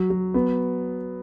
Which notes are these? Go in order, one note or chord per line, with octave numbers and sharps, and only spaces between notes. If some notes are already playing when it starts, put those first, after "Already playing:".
Already playing: F#3
F#3
B3